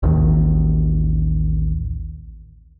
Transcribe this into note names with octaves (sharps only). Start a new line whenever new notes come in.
A1 D#2 D#3